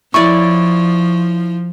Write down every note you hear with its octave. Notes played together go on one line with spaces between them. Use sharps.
F3 E4 C#5 D5 C#6